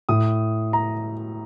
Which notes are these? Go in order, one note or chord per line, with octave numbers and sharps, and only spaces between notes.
A2 D#6
A#5